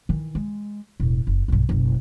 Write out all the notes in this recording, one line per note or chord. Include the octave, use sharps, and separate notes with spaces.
D#3 E3
G#3
E1 A2
F#1
B1 G2
F#1 B1